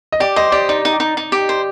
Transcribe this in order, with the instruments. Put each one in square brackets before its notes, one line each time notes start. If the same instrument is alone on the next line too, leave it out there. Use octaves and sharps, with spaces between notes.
[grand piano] D#5
[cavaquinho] G4 [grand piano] D5
[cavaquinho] C5 [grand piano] D#5
[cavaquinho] G4 [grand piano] D5
[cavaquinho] D#4 [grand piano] D5
[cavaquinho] D#4
D#4
D#4
G4
C5